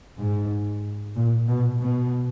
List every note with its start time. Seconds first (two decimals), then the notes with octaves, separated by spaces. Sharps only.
0.19 G#2
1.16 A#2
1.48 B2
1.80 B2